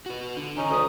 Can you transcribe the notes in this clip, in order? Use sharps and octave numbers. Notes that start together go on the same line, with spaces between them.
F#4 B4
D3
D3 D#3 C#4 D#4
D2 D#6